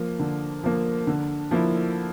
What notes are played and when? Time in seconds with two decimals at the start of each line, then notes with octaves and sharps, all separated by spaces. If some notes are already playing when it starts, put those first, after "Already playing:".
Already playing: F3 A#3
0.19 D3
0.64 F3 A#3
1.07 D3
1.51 F3 A#3 E4